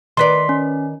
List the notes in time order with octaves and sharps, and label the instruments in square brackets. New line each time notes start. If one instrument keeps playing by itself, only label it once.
[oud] D#3 B4 D5 [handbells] C6 B6
[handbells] C#4